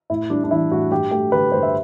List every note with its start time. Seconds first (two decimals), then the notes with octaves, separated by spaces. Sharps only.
0.10 A2 E4
0.30 G3 D4
0.44 D4
0.51 E3 E4
0.71 A2 F#4
0.91 G2 G4
1.11 A3 G4
1.32 D3 B4
1.52 G2 C5
1.63 E5